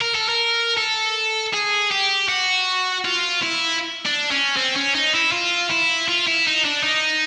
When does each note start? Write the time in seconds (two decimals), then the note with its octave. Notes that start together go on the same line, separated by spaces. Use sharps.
0.01 A#4
0.15 A4
0.29 A#4
0.77 A4
1.54 G#4
1.91 G4
2.29 F#4
3.05 F4
3.43 E4
4.05 D4
4.31 C#4
4.56 C4
4.76 C#4
4.95 D#4
5.14 E4
5.32 F4
5.70 E4
6.08 F4
6.27 E4
6.47 D#4
6.65 D4
6.83 D#4